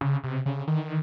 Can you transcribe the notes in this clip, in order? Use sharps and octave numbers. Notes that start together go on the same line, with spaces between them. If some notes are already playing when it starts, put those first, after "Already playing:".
C#3
C3
C#3
D#3